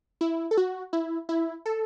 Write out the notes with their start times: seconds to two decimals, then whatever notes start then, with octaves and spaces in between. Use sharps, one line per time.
0.21 E4
0.51 A4
0.57 F#4
0.93 E4
1.29 E4
1.66 A4